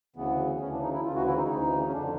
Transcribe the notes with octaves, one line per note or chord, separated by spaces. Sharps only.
D2 C#3 E3 B3
D2 C#3 E3 C#4
D4
D#4
E4
D2 C#3 E3 F4
F#4
E4
D#4
D2 C#3 E3 D#4
C#4
F2 D3 D4